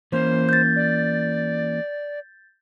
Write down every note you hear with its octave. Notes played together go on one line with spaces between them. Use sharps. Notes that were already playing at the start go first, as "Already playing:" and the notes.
E3 A#3 C#4 C5
G6 A6
D5